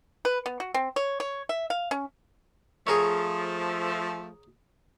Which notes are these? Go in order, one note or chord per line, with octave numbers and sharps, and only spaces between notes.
B4
B3
F#4
C4
C#5
C#5
E5
F5
C#4
F3 A3 G#4 A#4 C#5